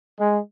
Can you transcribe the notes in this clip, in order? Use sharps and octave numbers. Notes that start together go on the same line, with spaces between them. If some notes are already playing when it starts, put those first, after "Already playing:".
G#3